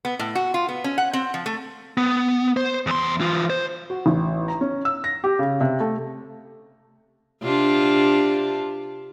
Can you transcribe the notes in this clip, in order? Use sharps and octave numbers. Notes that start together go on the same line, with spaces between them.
B3
A2
F#4
F4
B3
C#4
F#5
C4
F3
A3
B3
C5
E2 C6
E3 F4
C5
F#4
A1
A#5
C#4
E6
A#6
G4
C#3
C3
A3
C3 D4 F4